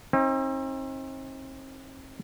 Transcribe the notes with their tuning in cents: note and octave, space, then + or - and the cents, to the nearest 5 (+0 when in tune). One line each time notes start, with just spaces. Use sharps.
C4 +40 D#4 +30